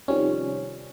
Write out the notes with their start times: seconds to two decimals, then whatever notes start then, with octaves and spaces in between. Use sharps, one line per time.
0.08 C3 D#3 F3 G3 C4 C#4